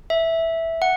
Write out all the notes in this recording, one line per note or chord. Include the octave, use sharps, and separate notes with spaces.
E5
F#5